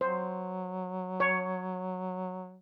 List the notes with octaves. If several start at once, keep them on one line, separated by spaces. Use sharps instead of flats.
F#3 C5
C#5